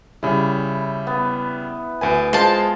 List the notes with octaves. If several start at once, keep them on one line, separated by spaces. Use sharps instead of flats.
C#3 G3 E4
B3
D2 B4 G#5
G#3 F4 C5 A5